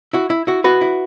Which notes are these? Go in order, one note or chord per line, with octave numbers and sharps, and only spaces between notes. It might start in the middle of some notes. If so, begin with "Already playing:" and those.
E4 F#4
E4
E4 F#4
F#4 B4
E4